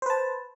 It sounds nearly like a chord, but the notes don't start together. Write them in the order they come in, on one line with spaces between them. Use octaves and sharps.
C5 B4 A5